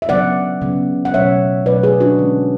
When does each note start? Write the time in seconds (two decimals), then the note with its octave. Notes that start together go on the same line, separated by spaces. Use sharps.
0.02 E5
0.09 C#3 F#3 B3 D5 F#5
0.61 C#3 F#3 B3
1.05 F#5
1.14 B2 F#3 A3 C#4 C#5 E5
1.66 B2 F#3 A3 C#4 B4 D5
1.83 G#4 B4
2.00 D4 F#4
2.18 D3 G#3 C#4